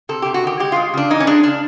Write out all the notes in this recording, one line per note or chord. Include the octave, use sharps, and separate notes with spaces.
C3 A4
C3 G4
F#4
D#3 G4
G#3 G4
G#3 F4
C#3 D4
E3 D#4
C#4
G#3 D4
C#3 D4